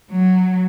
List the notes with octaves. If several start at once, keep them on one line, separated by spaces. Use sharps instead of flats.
F#3